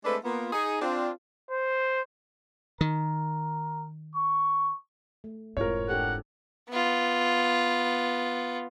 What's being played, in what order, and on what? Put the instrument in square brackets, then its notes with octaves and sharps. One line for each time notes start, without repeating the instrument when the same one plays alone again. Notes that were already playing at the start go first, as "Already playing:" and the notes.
[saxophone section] G#3 A3 C4 D4 A4 B4
A#3 B3 F4
D#4 G#4
C4 D4 F4
[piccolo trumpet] C5
[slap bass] D#3 [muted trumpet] A#4
[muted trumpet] C#6
[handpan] A3
[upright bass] F1 G#2 [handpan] C4 E4 F4 [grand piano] A#4 C#5
[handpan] D4 G4 A4 [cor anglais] F#5
[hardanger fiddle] B3 F4